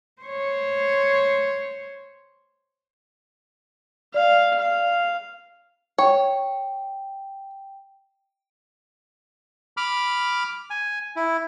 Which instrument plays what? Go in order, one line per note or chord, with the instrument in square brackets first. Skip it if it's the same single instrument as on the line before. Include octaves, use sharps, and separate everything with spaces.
[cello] C5 C#5
[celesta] D5 [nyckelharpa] F5
[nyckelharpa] F5
[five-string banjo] C#5 [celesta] G5
[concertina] B5 D6 F6
G#5
E4